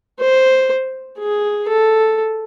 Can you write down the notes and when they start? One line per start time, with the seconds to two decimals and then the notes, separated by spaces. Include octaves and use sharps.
0.20 C5
1.19 G#4
1.68 A4